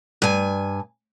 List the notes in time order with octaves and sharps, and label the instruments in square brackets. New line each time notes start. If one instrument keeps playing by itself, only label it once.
[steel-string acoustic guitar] G2 G#5